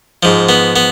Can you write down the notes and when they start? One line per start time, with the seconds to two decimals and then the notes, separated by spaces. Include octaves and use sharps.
0.23 G#2 F3
0.49 B3
0.76 B3